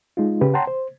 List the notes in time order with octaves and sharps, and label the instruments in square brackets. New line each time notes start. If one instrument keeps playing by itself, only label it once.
[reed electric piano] G#3 D#4 F4
C#3 G4 B4
C#5 F#5 G5 A5 A#5 C6
C5